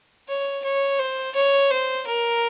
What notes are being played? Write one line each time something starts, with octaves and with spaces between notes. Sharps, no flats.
C#5
C#5
C5
C#5
C5
A#4